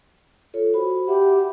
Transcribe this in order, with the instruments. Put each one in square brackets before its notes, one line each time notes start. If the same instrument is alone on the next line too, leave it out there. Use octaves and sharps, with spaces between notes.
[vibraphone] F4 A4 C#5
F#4 C5 B5
[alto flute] G4 [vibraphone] E5 F#5 B5